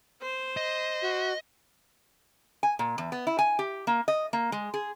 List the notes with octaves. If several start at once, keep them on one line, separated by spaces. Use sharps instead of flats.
C5
D#5
F#4
G#5
A#2
E2
B3
E4
G#5
G4
A#3
D#5
A#3
G#3
G#4